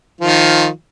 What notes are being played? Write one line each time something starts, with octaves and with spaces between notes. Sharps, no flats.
D#3 F3 F4